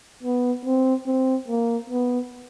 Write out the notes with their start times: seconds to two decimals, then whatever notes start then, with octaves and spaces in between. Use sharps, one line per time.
0.23 B3
0.65 C4
1.07 C4
1.48 A#3
1.90 B3